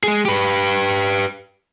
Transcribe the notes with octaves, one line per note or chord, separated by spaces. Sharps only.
G#3 G#4
G4 B4